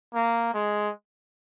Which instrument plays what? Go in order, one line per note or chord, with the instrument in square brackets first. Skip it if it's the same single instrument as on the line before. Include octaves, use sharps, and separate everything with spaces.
[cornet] A#3
G#3